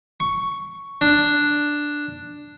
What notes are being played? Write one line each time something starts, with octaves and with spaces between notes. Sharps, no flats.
C#6
D4